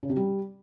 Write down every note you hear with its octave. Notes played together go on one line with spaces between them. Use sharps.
C#3
C3
G3